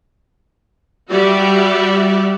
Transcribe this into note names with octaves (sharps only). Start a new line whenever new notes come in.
G3 F#4 G4 D5 E5